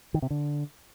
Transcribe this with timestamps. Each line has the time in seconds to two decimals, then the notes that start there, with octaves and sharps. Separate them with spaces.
0.14 D#3
0.22 C3
0.30 D3